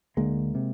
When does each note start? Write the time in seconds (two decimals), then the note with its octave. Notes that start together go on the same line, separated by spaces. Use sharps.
0.17 D2 D3 G#3 A#3
0.55 C3